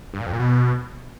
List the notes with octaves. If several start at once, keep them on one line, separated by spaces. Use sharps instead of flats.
G2
A#2
F2
A#2
B2